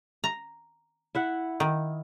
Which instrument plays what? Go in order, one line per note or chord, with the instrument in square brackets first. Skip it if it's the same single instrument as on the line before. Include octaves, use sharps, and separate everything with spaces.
[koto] A#5
[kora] E4 E5 F#5
[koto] D#3